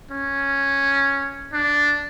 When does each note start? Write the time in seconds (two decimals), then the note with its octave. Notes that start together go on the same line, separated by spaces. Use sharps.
0.11 C#4
1.53 D4